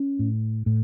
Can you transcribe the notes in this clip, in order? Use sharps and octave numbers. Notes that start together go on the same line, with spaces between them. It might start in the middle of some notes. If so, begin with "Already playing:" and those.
Already playing: C#4
A2
A2